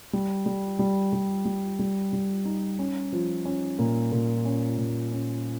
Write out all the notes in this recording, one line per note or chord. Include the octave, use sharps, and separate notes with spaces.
G3
G3
G3
G3
G3
G3
G3
D#4
C#4
F3
C#4
A#2
A#2
C#4
A#2
C#4